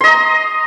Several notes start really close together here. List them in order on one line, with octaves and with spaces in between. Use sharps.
C6 D#5 A#5